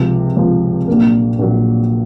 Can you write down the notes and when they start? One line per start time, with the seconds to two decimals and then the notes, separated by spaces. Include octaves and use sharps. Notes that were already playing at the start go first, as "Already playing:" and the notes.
Already playing: C#2 C3 F3
0.36 C#2 C3 F3
0.88 A#1 A#2 F#3 A#3
1.39 A#1 A#2 F#3 A#3